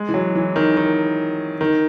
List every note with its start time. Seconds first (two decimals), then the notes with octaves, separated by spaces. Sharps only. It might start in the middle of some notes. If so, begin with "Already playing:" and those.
Already playing: G#3
0.09 E3
0.14 F#3
0.35 E3
0.56 D#3
0.77 D#3
1.61 D#3